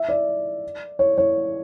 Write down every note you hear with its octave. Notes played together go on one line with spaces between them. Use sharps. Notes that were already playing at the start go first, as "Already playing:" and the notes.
Already playing: E5
D5
C#5
C#5